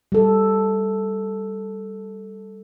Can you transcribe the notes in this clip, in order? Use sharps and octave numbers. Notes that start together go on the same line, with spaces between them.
G3 A4